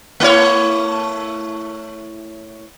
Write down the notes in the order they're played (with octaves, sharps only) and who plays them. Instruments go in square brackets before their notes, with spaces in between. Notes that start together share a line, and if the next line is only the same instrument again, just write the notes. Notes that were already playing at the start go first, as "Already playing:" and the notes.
[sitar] A3 E4 C#5